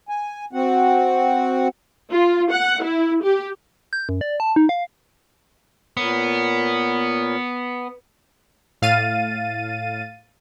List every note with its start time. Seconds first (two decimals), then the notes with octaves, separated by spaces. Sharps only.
0.09 G#5
0.53 C4 F#4 F#5
2.12 F4
2.52 F#5
2.82 E4
3.23 G4
3.93 G6
4.09 F#2
4.21 D5
4.40 A5
4.56 D#4
4.69 F5
5.97 A#2 B3 A#4 C#5
8.82 A2 F5 A6 D#7